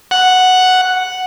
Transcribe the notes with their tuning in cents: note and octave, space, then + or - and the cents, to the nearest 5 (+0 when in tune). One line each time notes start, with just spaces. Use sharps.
F#5 +0